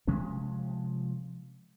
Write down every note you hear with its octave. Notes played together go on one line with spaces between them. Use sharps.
C3 F3 G#3 C#4